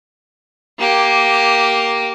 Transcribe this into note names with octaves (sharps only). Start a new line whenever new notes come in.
A#3 G4